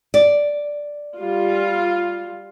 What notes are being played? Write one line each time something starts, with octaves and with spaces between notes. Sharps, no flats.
D5
G3 F4